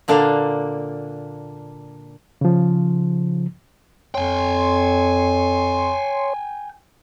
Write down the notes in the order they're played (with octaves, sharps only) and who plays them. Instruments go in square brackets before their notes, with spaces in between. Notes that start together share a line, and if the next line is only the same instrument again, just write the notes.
[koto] A#2 D3 A#3 D4
[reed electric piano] C#3 F3
[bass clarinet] F2 [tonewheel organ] C#5 C6 [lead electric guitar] G5 G#5